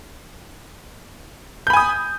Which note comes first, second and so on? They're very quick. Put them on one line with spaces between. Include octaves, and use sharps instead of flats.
G6 B5 G#5 D#6